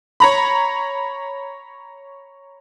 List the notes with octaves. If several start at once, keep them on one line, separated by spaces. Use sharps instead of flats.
C#5 A#5 B5